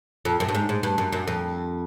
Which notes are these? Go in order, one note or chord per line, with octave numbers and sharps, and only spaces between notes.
F2
F#2
G2
G#2
G#2
G2
F#2
F#2
F2